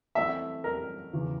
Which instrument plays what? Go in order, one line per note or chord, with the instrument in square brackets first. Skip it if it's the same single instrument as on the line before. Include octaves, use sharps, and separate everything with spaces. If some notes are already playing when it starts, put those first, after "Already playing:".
[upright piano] E3 A3 C4 E4 [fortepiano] E5
[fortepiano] A#4
[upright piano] E2 C#3 E3